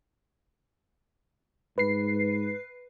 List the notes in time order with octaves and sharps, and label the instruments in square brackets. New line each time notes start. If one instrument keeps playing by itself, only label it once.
[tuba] G#2 [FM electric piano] B4 C7